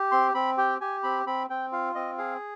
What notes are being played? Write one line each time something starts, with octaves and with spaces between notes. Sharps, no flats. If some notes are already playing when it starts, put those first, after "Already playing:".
Already playing: G4
C4 C6
C4 B5
G4 G5
G4 G#5
C4 B5
C4 B5
C4 G5
F4 F5
C4 D#5
G#4 F5